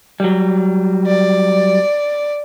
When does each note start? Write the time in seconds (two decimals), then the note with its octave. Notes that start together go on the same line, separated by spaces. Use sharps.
0.20 F#3 G3
1.07 D5